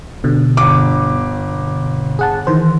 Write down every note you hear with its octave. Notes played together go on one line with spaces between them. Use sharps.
B2 D3
G1 D6
G#4 F#5 A5
D#3 E3 C5